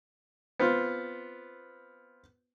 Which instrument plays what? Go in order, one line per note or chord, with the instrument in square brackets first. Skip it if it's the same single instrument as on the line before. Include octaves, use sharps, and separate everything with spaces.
[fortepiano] B3 C4 F4